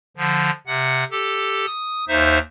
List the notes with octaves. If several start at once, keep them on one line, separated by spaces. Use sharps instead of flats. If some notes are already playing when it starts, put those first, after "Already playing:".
D3 F3
C3 F#5
G4 A4
D#6
D#2 D#4 C5 E5